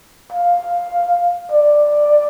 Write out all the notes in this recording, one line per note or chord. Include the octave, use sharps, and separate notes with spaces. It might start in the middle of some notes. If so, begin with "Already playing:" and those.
F5
D5